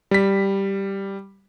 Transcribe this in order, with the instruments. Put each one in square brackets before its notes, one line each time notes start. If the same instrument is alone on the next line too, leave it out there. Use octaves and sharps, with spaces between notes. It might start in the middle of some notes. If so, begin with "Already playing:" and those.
[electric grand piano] G3 B6